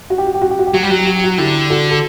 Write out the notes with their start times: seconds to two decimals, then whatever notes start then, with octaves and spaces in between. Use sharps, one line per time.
0.10 F#4
0.18 G4
0.27 F#4
0.34 G4
0.42 F#4
0.50 G4
0.59 F#4
0.67 G4
0.74 F#3 F#4
0.82 G3 G4
0.90 F#3 F#4
0.98 G4
1.07 F#4
1.15 G4
1.24 F#4
1.37 D3 E4 G4
1.70 F#4 A4
1.91 A4